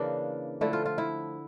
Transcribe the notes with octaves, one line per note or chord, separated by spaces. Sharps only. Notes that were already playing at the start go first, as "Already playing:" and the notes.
Already playing: C#3 E3 A#3 D4
D3 F3 A3 E4
F4
F4
E4